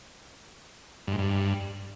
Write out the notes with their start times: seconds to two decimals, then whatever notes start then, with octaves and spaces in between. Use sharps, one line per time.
1.07 G2
1.13 G#2
1.18 G2